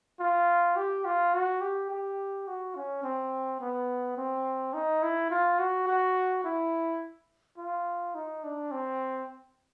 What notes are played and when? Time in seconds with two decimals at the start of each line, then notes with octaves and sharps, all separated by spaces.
0.20 F4
0.76 G4
1.05 F4
1.34 F#4
1.61 G4
1.90 G4
2.47 F#4
2.75 C#4
3.03 C4
3.60 B3
4.17 C4
4.73 D#4
5.03 E4
5.30 F4
5.59 F#4
5.87 F#4
6.44 E4
7.57 F4
8.15 D#4
8.43 D4
8.71 C4